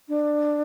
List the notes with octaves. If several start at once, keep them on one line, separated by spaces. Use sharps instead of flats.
D4